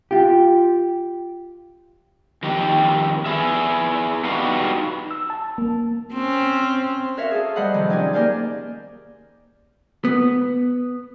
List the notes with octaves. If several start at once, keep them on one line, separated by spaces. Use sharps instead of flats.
F4 G4
F2 D#3 G4
B3 G#4 E5
D4 D#4 F#4 G4 B4 F5
E6
A5
A#3
C4 C#4
F#4 A#4 C#5 E5 F5
G#4 A4
G3 C5 D#5 F#5 B5
C3 D#3 F3 F#3
C#4 D#4 G4 D5 G#5
A#3 G4 A#4 C5 D5 G#5
B3